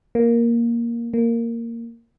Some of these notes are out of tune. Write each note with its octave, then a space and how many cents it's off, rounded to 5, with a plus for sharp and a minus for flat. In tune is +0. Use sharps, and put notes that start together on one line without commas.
A#3 +5
A#3 -10